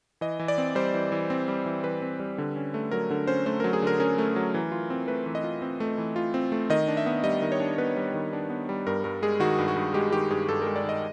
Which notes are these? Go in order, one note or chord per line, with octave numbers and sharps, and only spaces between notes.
E3 D#5
E3
D5
C4
G3 C5
E3
E3
C4
G3
E3
E3 B4
C4
G3
D3
C#4
A3
F#3 A#4
D3
C#4 C5
A3 C5
F#3 A#4
G#4
D3 A#4
C#4 A#4
A3
F#3
E3
F4
C4
A3 B4
E3
D#5
F4
C4
A3
E3
F4
C4
A3
D#3 D#5
D4
E5
B3
G3 D#5
D#3
C#5
D4
B3 B4
G3
D#3
D4
B3
G3
G2 A#4
G2 A#4
G#3 G#4
D#3 F#4
G2
F#4
G2
G#3 G4
D#3 G4
G2 G#4
G2 A4
G#3 A#4
D5
D#3 D#5